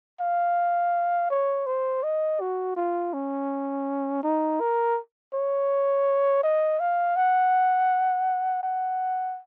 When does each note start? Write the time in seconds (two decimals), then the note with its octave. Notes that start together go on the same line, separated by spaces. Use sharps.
0.20 F5
1.30 C#5
1.66 C5
2.03 D#5
2.41 F#4
2.76 F4
3.13 C#4
4.23 D#4
4.60 A#4
5.34 C#5
6.43 D#5
6.80 F5
7.16 F#5
8.63 F#5